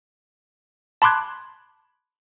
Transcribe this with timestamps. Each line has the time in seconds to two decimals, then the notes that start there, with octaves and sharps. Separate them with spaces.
1.02 A5 B5 C6 D6 F#6 G#6